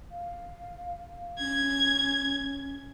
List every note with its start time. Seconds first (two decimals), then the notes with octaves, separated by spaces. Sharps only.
0.11 F5
1.39 C#4 G#6